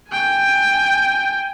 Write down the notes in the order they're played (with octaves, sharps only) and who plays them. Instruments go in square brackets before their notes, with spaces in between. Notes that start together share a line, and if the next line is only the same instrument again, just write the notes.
[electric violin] G5 G#5